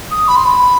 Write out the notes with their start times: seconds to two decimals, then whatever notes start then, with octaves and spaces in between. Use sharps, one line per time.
0.10 D#6
0.27 B5
0.35 C6
0.44 B5